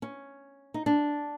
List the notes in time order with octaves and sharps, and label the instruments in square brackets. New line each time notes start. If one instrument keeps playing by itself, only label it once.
[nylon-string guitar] C#4
D#4
D4